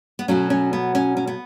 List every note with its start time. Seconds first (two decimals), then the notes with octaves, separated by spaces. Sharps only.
0.19 B3
0.28 B2 F#3 A3 C#4
0.50 C#4
0.73 B3
0.95 C#4
1.17 C#4
1.27 B3